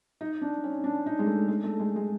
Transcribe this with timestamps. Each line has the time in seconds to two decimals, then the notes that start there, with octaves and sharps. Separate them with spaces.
0.21 D#4
0.42 D4
0.64 C#4
0.84 D4
1.06 D#4
1.19 G#3
1.26 A3
1.48 G#3
1.64 A3
1.80 G#3
1.96 G#3